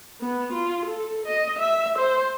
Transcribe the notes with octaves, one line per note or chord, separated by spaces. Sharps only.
B3
F4
A4
D#5
E5
C5